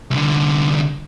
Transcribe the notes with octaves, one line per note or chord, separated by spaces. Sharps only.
C2 D3